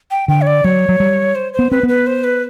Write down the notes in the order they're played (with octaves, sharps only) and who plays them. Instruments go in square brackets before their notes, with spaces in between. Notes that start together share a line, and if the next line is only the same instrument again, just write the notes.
[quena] G5
[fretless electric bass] D3 [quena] G5
[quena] C#5
D5
[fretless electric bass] F#3 [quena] C#5
[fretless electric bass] F#3
G3
[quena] C5
C5
[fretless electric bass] B3
[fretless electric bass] C4 [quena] B4
[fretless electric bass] B3
[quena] B4
C5
B4